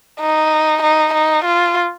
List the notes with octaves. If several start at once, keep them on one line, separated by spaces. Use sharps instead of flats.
D#4
D#4
D#4
F4